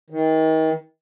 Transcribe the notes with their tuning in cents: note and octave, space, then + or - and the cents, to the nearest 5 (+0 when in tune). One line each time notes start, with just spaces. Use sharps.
D#3 +35